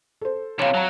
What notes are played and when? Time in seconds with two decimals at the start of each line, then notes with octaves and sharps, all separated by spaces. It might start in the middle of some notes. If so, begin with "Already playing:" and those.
0.21 A4 C5
0.59 C3 E3 C#5 F5
0.74 F#3 A5 A#5